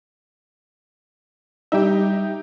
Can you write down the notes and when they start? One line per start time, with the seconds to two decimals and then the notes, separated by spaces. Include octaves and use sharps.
1.72 G3 D#4 G4 E5